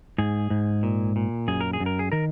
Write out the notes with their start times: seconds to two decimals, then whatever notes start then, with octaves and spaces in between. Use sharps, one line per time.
0.18 G#2 G#4
0.50 G#2
0.83 A#2
1.16 A#2
1.48 F#2 G#4
1.61 A#4
1.73 G#4
1.80 F#2
1.86 A#4
1.99 G#4
2.12 D#3 A#4